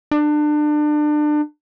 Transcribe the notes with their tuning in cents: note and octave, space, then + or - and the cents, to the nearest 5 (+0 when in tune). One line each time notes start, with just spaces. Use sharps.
D4 +30